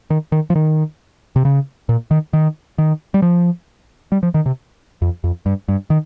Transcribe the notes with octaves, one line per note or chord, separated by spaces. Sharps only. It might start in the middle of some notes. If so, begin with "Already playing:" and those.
D#3
D#3
F3
D#3
C3
C#3
A#2
D#3
D#3
D#3
G3
F3
G3
F3
D#3
C3
F2
F2
G2
G2
D#3